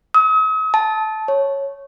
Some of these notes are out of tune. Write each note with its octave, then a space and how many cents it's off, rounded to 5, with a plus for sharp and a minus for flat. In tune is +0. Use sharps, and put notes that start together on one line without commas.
D#6 +45
A5 -15
C#5 -5